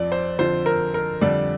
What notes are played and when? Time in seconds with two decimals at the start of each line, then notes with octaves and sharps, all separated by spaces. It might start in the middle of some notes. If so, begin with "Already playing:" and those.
Already playing: F2 F3 D5
0.12 C5
0.39 F2 D3 F3 C5
0.66 A#4
0.94 A#4
1.21 F2 D3 G3 D5